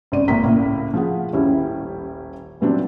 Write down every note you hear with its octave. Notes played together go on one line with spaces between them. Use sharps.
G#1 C#3 D5 D#7
G#1 A2 A#3 A#5 B6
C#2 A2 A#3
F3 G#4 F#5
D#1 A1 G3 C#4 E4
A#2 E3 F#3 G3 C4 D4